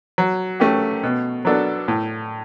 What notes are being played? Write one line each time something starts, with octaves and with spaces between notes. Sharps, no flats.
F#3
A3 C#4 G4
B2
F#3 B3 D4 A4
A2